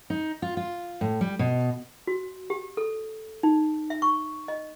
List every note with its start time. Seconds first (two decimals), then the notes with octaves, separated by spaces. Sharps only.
0.10 D#4
0.42 F4
0.57 F4
1.01 A2
1.21 G3
1.39 B2
2.07 F#4
2.50 G4
2.77 A4
3.43 D#4
3.90 E5
4.02 C#6
4.48 D#5